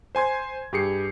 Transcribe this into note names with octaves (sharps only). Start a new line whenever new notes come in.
C5 G#5 C6 G#6
G2 G4 G#4 C7 C#7